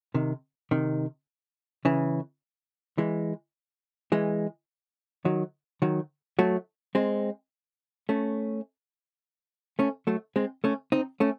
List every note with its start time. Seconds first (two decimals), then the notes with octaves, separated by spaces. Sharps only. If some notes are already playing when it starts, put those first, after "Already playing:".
0.14 C3 D#3
0.71 C3 D#3
1.85 C#3 E3
2.98 E3 G#3
4.12 E3 G#3
5.25 D#3 F#3
5.82 D#3 F#3
6.39 F#3 A3
6.95 G#3 C4
8.09 A3 C#4
9.79 A3 C#4
10.07 F#3 A3
10.36 G#3 C4
10.64 A3 C#4
10.92 C4 D#4
11.20 A3 C#4